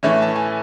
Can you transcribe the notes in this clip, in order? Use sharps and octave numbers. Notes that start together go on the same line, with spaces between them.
A2 E3 A3 C#4 C#5 E5
A5
G#5